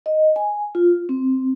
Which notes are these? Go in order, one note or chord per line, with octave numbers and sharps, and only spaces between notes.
D#5
G#5
F4
C4